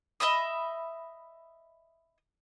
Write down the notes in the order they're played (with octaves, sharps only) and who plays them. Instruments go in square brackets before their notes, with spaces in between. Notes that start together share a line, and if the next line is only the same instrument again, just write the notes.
[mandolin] D#5 E5 B5 D#6